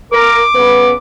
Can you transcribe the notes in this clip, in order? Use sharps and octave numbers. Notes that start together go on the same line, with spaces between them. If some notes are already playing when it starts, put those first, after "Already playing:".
A#4 D6
C#3 B3 B4